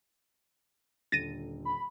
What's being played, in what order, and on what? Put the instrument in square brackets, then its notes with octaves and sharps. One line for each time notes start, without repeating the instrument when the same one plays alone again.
[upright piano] D#1 D3 [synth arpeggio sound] A6 A#6 D#7
[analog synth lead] B5